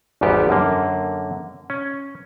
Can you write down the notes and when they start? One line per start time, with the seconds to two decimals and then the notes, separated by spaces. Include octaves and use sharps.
0.21 G#1 E2 G#2 G3 B3 G4
0.49 F#2 D3 A#3
1.70 C#4